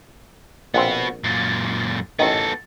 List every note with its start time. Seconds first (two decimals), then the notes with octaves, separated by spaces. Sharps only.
0.74 A#1 B3 C4 F#4
1.24 F#2 A#2
2.19 A1 D#3 B3 A4